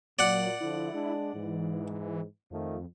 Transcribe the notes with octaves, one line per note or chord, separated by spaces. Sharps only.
A#2 F#3 D5 F#5
D3 F3 E4
G#3 D4
G#2 E3
F2 D#3 F3 A3